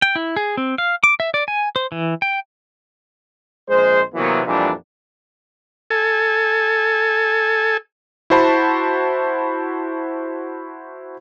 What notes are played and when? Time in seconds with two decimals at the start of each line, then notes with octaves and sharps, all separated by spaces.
0.02 G5
0.16 E4
0.36 G#4
0.57 C4
0.78 F5
1.04 D6
1.20 E5
1.34 D5
1.48 G#5
1.76 C5
1.92 E3
2.22 G5
3.69 A#1 G#3 C5
4.14 C3 E3 F#3 A#3 B3
4.46 F2 A#2 E3 G3 D4
5.90 A4 G#5
8.30 E4 F#4 C5 A5 B5